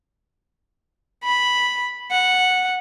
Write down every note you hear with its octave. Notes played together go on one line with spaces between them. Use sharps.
B5
F#5